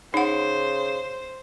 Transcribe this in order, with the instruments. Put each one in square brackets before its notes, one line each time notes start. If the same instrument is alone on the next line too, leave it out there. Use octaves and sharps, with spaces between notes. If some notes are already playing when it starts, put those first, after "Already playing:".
[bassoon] C#3 [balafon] D#4 F#5 [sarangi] C5